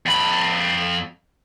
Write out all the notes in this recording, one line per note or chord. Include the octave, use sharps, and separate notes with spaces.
F2 B5